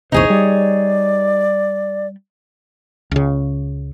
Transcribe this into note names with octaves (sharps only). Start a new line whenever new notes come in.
A#1 E2 C3 D#4 G#4 C5 C#5
G3 D5
C#2 C#3